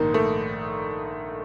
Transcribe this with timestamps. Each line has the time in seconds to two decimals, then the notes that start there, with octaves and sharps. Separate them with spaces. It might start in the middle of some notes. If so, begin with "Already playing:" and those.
Already playing: A#1 G#2 D#3 A#3
0.14 A3